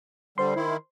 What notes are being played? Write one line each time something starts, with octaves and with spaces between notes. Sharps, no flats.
D3 G3 C5 C6
D#3 E4